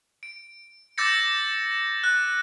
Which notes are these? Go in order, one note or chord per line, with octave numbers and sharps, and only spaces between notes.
D7
D6 E6 G6 A6 A#6 C#7
F#6